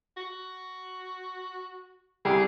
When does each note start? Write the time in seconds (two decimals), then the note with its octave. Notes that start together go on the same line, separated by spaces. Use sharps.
0.17 F#4
2.25 C2 G4 G#4